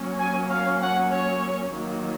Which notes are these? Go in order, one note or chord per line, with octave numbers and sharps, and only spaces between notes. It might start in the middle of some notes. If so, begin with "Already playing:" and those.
Already playing: F#3 A#3 C#4
G#5
F5
F#5
C#5
D#3 F#3 A#3